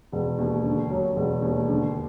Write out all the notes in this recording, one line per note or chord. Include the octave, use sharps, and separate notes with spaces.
E1
D#2
D3
F#3
E1
D#2
D3